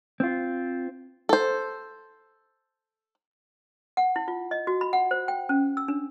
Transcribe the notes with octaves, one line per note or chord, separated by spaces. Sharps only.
C4 F4
A4 C5
F#5
E4
F4
D#5
F#4
B5
F#5
C5
G5
C#4
E6
D4